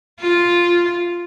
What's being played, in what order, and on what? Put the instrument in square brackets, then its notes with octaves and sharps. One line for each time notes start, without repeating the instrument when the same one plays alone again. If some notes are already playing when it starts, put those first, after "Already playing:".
[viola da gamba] F4